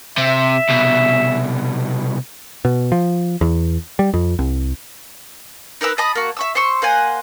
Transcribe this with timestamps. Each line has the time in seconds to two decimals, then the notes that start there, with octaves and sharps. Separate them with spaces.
0.18 C3 E5
0.69 C2 B2
2.65 B2
2.92 F3
3.41 E2
3.99 G3
4.14 F2
4.39 C2
5.81 D#4 A#4 B4 E6
5.98 D#5 A5 B5 D#6
6.15 A#3 F#4
6.37 E5 C#6 E6
6.55 C5 C6 C#6 E6
6.82 A#3 C5 F#5 G#5